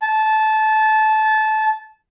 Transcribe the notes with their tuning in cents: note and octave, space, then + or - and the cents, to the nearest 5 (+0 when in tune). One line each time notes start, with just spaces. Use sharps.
A5 -20